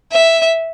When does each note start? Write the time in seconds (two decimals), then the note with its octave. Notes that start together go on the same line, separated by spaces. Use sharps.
0.12 E5